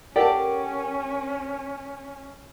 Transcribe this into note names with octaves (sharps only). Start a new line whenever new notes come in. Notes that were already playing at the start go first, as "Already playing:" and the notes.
C#4 G4 A4 A#4 D5 F#5 A5